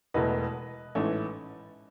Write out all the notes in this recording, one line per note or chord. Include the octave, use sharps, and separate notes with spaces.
E1 E2 B2 A3 B4 D#5
A1 G#2 E3 A3 C#4